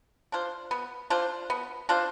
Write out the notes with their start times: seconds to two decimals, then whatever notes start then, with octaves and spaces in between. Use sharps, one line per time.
0.32 D4 F4 C5
0.71 B3
1.10 D4 F4 C5
1.50 B3
1.89 D4 F4 C5